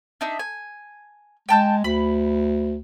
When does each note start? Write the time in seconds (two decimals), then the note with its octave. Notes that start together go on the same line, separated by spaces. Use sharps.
0.21 D4 D#4 E5
0.39 G#5
1.49 G#3 G5 A5 G6
1.84 D2 B5